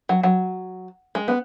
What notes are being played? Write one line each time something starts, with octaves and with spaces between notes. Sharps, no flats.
F#3
F#3
G#3
B3